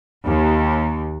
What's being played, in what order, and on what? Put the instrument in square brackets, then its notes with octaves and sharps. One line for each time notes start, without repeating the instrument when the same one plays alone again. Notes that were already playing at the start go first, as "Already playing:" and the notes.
[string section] D#2